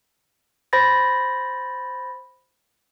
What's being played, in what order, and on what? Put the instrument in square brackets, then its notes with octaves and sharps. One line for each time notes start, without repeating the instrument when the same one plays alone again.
[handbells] C5 B5 A6 A#6